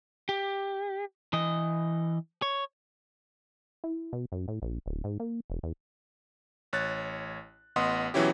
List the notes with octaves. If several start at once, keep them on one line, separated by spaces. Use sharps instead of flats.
G4
E3 D#5
C#5
E4
B2
F#2
A2
A#1
D1
G#2
A#3
E1
E2
A1 C#5 F#6 A6
A1 B3 D#5 F#5 C6 D#6
B2 E3 F#3 C#4 E4 G4